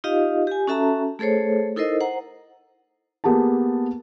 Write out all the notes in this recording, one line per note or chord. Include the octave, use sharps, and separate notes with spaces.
D#4 F4 G4 D#5 F5
G4 G#5
C#4 F#4 A4 E5 A5 A#5
A3 G#4 A4 C5 C#5
D#4 E4 A4 A#4 C5 D#5
C5 F#5 A#5
A#3 B3 G4 G#4 A5